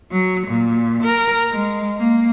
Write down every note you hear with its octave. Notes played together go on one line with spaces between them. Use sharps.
F#3
A#2
A#4
G#3
A#3